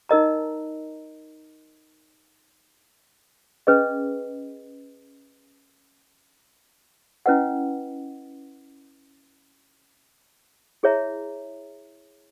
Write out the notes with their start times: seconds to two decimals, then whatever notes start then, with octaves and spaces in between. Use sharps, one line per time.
0.09 D#4 A#4 D#5 A#5
3.67 C#4 G#4 B4 D#5
7.26 C#4 E4 B4 D#5 F#5
10.83 E4 G#4 C#5 E5 A#5